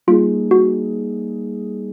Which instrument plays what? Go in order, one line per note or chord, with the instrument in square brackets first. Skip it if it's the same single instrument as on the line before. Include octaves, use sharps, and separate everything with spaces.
[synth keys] G3 A#3 D#4 G#4 [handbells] F4
[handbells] F#4